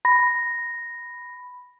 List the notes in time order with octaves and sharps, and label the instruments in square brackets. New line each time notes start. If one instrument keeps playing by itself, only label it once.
[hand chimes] B5 A#6